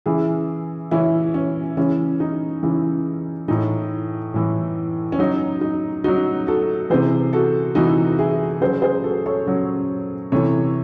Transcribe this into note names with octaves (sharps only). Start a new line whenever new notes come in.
C#3 E3 E4 G#4
C#3 E3 C#4 E4
C#4
C#3 E3 C#4
D#4
C#3 E3
A2 E3 D#4
A2 E3
C#4
C#3 F#3 D#4
D#4
C#3 F#3 D#4 F#4
F#4 A4
C3 E3 G#4 C5
F#4 A4
C3 E3 D#4 F#4
E4 G#4
C#3 F#3 G#4 C5
G#4 C5
F#4 A4
A4 C#5
C#3 F#3
C3 E3 A4 C#5